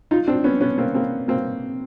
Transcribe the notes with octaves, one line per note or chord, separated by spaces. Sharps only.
D#4 F4
C4 D4
B3 C#4
B3 C#4
A#3 C4
A#3 C4
A#3 C4